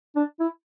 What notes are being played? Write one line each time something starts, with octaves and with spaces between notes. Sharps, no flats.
D4
E4